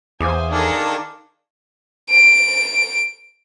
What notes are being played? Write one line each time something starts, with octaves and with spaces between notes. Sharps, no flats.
E2 C5 F5 G#5 D6 D#6
D#3 D4 G#4 A4 A#5
D7